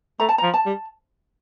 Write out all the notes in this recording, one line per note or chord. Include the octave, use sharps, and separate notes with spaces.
A3 A#5
A5
F3 A#5
A5
G3